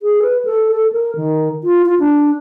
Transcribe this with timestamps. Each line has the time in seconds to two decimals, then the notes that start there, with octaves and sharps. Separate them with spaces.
0.02 G#4
0.22 B4
0.45 A4
0.71 A4
0.92 A#4
1.16 D#3
1.63 F4
1.86 F4
1.99 D4